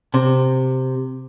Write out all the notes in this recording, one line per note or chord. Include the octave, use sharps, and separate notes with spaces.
C3